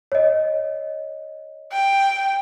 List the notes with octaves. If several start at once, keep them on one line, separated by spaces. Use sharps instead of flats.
C#5 D#5
G5